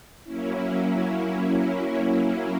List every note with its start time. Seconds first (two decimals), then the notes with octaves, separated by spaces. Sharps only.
0.24 F#3 A#3 C#4 E4